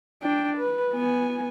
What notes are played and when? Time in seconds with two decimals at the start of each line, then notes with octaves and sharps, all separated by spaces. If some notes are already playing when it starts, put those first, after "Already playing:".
0.23 D4 G5
0.57 B4
0.93 B3 G#5